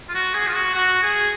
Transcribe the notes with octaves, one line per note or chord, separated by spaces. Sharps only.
F4
F#4
G#4
F4
F#4
F#4
G#4